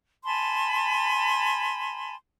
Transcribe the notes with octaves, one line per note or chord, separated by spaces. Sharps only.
G#5 A5 B5 C6